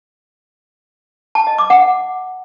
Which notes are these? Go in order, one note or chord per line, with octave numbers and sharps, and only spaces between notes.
A5
D#5
D6
F#5